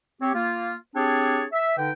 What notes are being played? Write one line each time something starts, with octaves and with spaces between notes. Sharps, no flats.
C4 G4 C#5
A#3 F4
C4 D4 G4 G#4 C#5 A5
E5
D3 D#4 B4 G5